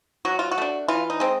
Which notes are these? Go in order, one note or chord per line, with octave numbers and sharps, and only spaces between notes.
F#3 F#4
F4
F#4
A3 D4
E3 F4
D#4
G#3 C4